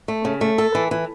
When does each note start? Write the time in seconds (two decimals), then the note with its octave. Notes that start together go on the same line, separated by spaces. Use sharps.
0.08 A3
0.25 C#3
0.41 A3
0.58 A4
0.75 E3
0.91 E3